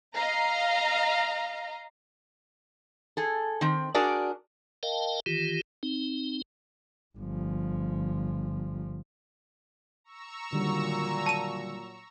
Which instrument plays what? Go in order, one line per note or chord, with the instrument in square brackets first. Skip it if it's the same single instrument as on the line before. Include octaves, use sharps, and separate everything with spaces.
[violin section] D#5 F5 A#5
[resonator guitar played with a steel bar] G#4 A4
D#3 C4
D4 F#4 G#4 A#4 D5
[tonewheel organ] A#4 D#5 F5 G5 A5
D#3 E3 F4 G4
C4 D#4
[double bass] G1 F3
[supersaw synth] A#5 C#6 E6
[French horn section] A#2 F#3 [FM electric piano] D3 D#3 G3
[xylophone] A5 D#7